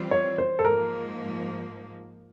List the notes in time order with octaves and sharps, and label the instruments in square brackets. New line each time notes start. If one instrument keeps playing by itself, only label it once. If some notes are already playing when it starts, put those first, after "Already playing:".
Already playing: [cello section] E3 G3 C4 F4
[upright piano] C#5
C5
A4
[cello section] G#2 F3 A#3 [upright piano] A#4